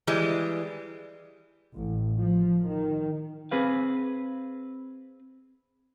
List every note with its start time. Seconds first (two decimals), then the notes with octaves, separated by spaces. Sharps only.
0.07 E3 G3 G#3
1.74 A1
2.19 F3
2.67 D#3
3.51 C4 G#4 B4 F5